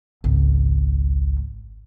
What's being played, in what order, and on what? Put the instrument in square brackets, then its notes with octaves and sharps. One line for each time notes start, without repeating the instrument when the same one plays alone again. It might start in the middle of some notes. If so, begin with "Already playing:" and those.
[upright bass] G#1 C#2